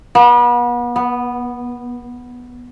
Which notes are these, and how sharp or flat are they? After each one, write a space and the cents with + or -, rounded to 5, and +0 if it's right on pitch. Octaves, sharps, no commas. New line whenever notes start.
B3 -35
B3 -5